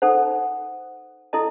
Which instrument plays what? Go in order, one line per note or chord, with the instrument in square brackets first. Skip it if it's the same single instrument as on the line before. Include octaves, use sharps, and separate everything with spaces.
[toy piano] D#4 A4 C5 F#5
E4 A4 D#5 A5